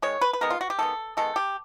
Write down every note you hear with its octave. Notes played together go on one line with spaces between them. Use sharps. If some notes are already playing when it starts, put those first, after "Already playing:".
D#3 G#3 C#5
B4
B4
D#3 G#3 B3 A#4
F4
F#4
G4
D#3 G#3 B3 A4
D#3 G#3 B3 A4
G4